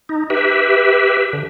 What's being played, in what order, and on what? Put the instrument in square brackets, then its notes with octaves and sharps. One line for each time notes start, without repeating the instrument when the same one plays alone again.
[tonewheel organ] D#4
G4 B4 E5
D3